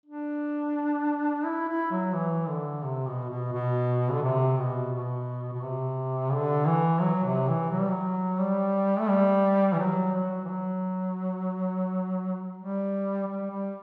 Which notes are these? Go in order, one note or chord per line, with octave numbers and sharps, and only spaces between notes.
D4
E4
E4
F#3
E3
D3
C3
B2
B2
B2
D3
C3
B2
B2
B2
C3
D3
E3
F#3
C3
E3
F#3
G3
F#3
G3
A3
G3
E3
F#3
F#3
E3
F#3
G3
G3
G3